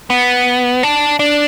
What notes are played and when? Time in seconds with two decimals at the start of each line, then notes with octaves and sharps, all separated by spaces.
0.10 B3
0.83 D4
1.19 D4